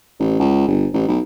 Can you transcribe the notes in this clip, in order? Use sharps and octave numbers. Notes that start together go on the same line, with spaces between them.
A1
C#2
G1
A1
B1